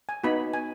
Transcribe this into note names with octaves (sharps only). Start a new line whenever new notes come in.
G#5
B3 D#4 F#4 B5
G#5